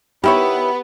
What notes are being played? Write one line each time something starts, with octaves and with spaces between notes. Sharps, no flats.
D#3 B3 E4 G4 C#5 B5